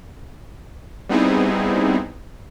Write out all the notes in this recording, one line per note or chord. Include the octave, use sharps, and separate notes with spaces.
G3 B3 C4 D#4 E4 G#4